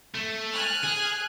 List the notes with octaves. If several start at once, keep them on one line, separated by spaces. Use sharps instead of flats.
A3
G#5 F6 F#6
G#4